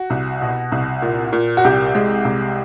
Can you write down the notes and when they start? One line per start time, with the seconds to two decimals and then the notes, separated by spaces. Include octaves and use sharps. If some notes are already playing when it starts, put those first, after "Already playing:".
Already playing: F#4
0.10 C2
0.42 B2
0.72 C2
1.02 A#2
1.33 A#2
1.57 F#4
1.65 C2 G4
1.95 G#3
2.25 C2